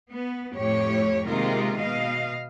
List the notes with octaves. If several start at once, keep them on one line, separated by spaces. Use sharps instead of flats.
B3
F2 A2 G4 C#5
C3 D#3 G#3 A#3 F4 A#4
B2 D#5 F5